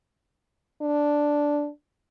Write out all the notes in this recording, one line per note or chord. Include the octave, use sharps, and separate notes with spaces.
D4